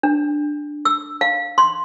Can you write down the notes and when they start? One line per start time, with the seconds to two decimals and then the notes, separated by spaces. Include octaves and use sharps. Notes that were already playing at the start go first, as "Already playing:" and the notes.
0.03 D4
0.85 E6
1.21 F5
1.58 C6